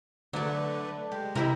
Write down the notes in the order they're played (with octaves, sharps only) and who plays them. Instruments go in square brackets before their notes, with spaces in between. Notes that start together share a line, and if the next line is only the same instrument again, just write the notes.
[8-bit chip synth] D3 A3 B4 [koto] F#3 D5 [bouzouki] D4 A4
[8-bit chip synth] G#3 [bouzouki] G4
[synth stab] C3 E4 [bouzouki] D#4 G4 G5 [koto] A#4